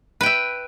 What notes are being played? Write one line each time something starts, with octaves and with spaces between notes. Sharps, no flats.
B4 E5 G5